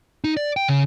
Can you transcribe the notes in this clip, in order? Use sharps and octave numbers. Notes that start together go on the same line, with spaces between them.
D#4
D5
G5
C#3